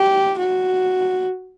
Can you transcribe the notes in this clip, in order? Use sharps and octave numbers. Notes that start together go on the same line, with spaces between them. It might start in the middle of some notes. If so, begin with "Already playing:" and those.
Already playing: G4
F#4